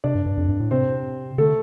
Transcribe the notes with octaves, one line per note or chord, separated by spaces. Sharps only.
C3 D4 D5
G2
G2
F2
G2
A2
C3 C4 C5
D3 A3 A4